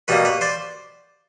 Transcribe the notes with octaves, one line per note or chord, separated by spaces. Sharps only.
B2 G3 A#3 B4 C#5
B4 C#5
C5 D5